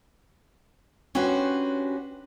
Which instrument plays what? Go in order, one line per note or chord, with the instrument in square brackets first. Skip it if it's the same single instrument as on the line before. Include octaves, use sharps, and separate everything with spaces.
[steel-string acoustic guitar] C#4 D4 F#4 G4 B4 C5